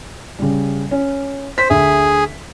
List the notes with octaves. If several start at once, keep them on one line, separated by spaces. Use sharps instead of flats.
C#3 G3
C#4
C5 B6
D2 G#4 E5